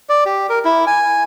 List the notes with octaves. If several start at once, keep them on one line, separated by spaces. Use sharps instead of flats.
D5
G4
A#4
E4
G#5